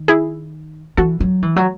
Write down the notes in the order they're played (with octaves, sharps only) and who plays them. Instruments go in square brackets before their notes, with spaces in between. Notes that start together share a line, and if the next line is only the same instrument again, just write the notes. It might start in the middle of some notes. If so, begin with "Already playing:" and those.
Already playing: [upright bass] D#3
[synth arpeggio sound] E4 G#4
[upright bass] E3 [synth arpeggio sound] F#4 A4
[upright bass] F#3
E3
F#3